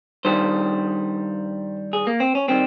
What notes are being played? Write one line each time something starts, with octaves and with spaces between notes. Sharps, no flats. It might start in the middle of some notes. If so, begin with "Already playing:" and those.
G2 D#3 G3 C5
G#4
A#3
C4
C#4
D#3 G3 C4